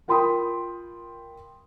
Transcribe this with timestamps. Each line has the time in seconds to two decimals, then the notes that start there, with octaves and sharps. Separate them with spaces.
0.08 F4 A#4 G5 B5 C6 D#6